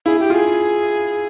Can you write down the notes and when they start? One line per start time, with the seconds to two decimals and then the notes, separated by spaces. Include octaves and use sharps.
0.06 E4 G#4
0.19 G4
0.30 F4 G#4